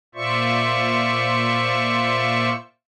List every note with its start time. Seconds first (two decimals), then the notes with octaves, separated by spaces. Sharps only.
0.15 A#2 F4 C5 D5 E5 C#6